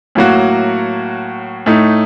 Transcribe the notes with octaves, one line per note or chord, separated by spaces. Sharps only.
A2 F#3 A#3 F#4
A2 A3 D#4